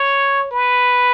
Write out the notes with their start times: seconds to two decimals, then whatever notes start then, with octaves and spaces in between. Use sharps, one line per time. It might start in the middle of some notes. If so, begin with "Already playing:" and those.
Already playing: C#5
0.51 B4